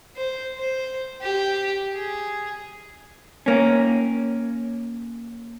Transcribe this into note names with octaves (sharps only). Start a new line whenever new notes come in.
C5
C5
G4
G#4
A#3 C#4